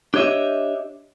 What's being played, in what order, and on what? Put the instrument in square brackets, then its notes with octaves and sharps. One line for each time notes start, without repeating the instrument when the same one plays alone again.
[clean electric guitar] D4 G4 C#5 D#5 E5